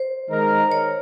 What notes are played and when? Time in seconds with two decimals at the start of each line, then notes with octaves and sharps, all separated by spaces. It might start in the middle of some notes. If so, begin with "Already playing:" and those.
Already playing: C5
0.30 D#3 G#3 D#4 A#4
0.72 C#5